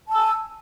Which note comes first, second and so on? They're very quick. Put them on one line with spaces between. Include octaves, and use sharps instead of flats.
A5 E6 G#5